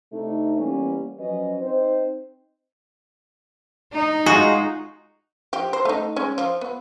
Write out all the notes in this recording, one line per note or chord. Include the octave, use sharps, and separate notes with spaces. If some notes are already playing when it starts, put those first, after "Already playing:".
C3 A3 D4 D#4
E3 G3 A#3 B3 C#4
F3 F#3 C#4 B4 D#5
C4 D#4 C5
D#4
G#3 F4 F#4 G#4
F3 G4
C5
A3 D#4
G#3 C#4
F3
B3